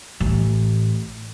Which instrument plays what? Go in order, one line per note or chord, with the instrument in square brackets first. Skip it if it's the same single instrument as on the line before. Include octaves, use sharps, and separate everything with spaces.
[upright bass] A1